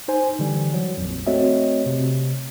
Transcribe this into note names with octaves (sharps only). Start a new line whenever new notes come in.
D#4 C5 G#5
D3 E3 G3
F#3
A#1 F2
A3 C4 F#4 C#5 D#5 E5
C3